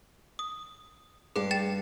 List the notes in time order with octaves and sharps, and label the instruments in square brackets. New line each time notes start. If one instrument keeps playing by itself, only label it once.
[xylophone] D#6
[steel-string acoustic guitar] G2 F5 [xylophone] G#4
[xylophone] G5 A6 E7